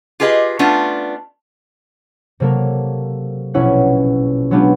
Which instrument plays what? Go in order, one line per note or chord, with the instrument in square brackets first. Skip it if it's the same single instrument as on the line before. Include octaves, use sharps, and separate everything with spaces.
[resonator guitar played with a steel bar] F4 G4 G#4 B4 D#5
A3 B3 C#4 D4 F4
[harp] C3 F#3 A#3 A4 A#4
A#1 B2 C#4 E4 C#5 F#5
F#3 G#3 B3 D4 F4 G4